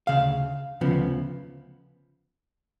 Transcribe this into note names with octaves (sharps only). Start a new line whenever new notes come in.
D2 C#3 F5
D2 C#3 F3 B3